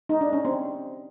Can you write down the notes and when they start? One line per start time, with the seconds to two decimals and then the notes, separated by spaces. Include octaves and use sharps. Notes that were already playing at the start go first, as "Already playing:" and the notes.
0.09 D#4
0.21 D4
0.33 C#4
0.45 C4